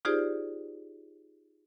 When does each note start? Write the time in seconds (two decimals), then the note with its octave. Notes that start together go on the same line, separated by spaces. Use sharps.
0.05 D#4 F4 G4 G#4 C5 D5